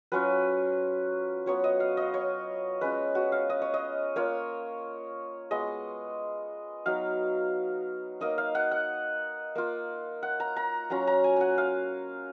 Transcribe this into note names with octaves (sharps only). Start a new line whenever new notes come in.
F#3 C#4 F4 B4
F#3 B3 F4 C#5
D#5
F5
D#5
C#5
G#3 C#4 F4 B4
F#4
F5
D#5
C#5
D#5
A#3 F4 C#5
G#3 B3 F4 D#5
F#3 B3 D#4 F5
A#3 D#4 D#5
F5
F#5
F#5
A#3 F4
F#5
A#5
A#5
F#3 C#4 F4 A#5
A#5
G#5
F#5 G#5
F5